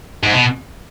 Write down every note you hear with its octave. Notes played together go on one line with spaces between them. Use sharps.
G#2
B2